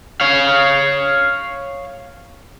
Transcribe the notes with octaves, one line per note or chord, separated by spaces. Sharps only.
C#5 F5